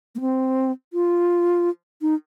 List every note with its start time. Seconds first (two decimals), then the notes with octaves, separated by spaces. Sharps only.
0.15 A#3
0.21 C4
0.93 F4
2.02 D#4